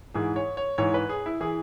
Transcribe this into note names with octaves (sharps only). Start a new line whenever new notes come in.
G#2 E3 G#4
C#5
C#5
G#2 E3 C#5
B4
G#4
E4
E3 G#4